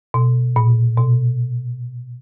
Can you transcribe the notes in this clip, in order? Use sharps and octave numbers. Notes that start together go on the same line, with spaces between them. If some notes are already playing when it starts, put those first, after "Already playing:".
B2
A#2
B2